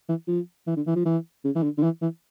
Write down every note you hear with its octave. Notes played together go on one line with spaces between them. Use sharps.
E3
F3
E3
D3
E3
F3
E3
C#3
E3
D3
D3
E3
E3